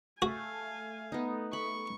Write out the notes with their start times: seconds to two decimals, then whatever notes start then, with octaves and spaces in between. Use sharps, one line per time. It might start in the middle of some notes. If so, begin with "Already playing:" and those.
0.22 A3 F#4 F5 G#5
1.12 B3 D#4
1.53 B5 C#6